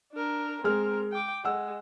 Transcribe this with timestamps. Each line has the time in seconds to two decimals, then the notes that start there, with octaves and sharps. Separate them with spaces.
0.13 D4 A#4
0.64 G#3 C4 A#4 F6
1.12 G5 D6
1.45 G#3 F#5 E6